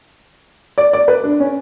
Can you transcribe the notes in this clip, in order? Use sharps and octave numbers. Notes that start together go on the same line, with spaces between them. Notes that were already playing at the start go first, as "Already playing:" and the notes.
D5
D5
B4
D4
C#4